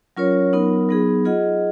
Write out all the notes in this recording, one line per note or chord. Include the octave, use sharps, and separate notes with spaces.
F#3 C#4 F4 A#4 C#5
F#3 B3 D#4 A#4
F#3 B3 D#4 G#4
F4 G#4 D#5 F#5